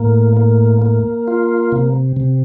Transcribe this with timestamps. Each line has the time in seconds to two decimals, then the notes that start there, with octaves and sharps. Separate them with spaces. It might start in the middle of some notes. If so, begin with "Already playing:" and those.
Already playing: A2 A#3
0.37 A#3
0.82 A#3
1.28 F4
1.72 C3
2.16 C3